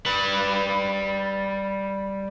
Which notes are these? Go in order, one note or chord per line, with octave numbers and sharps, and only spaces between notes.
G3 B4